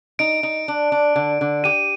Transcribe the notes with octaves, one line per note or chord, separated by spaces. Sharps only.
D#4 D7
D#4
D4
D4
D3
D3
G4 D#7